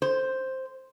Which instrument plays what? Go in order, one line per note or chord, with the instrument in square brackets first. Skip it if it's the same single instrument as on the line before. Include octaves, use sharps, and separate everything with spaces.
[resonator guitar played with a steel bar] C5